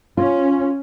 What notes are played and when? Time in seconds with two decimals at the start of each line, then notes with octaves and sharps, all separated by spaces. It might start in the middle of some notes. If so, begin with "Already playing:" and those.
0.17 C#4 F4